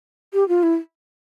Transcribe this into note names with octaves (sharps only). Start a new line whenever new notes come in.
G4
F4
E4